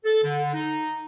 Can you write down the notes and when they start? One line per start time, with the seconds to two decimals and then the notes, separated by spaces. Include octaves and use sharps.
0.04 A4
0.23 D3
0.54 D#4